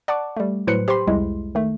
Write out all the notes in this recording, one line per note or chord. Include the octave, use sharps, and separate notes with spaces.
D5 F#5 A5 C#6 D6
G3 A3
A2 F#3 B4 C5 F#6 C#7
G4 C5 G5 B5 C6
C2 F2 G3 G#3 E4
D#3 A3